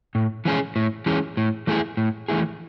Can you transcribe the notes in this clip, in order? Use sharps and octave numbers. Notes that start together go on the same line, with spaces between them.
A2
E3 G#3 C#4 G#4
A2
E3 G#3 C#4 G#4
A2
E3 A3 E4 G#4
A2
E3 A3 E4 G#4